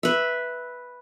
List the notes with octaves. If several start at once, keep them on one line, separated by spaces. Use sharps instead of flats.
B4 E5